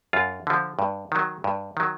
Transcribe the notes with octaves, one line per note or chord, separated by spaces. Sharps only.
F#2 F4
D3 F3
G2
D#3 F#3
G2
D#3 F#3